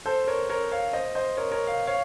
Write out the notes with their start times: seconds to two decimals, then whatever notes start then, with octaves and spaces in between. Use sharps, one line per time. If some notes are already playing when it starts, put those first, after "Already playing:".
0.06 A4 C5
0.27 A#4 C#5
0.49 A#4 C#5
0.72 C#5 F5
0.93 C5 D#5
1.15 C5 D#5
1.37 A#4 C#5
1.52 A#4 C#5
1.67 F5
1.87 C#5 F5